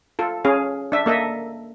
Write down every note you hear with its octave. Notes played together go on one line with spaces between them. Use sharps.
F4 A4
C#4 G#4 F5
D4 E5
A#3 A4 D#5 E5